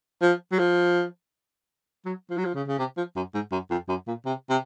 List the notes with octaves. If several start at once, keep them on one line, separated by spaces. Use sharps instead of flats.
F3
F#3
F3
F#3
F3
F#3
F3
C#3
C#3
C3
F3
F#2
G#2
F#2
F2
F#2
A#2
C3
C3